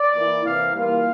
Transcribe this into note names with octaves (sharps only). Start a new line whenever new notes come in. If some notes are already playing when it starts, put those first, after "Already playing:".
Already playing: D5
E3 A#3 E4
C3 E3 A#3 F5
E3 G3 A#3 F4 F5